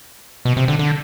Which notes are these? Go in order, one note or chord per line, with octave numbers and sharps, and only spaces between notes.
B2
C3
D3
D3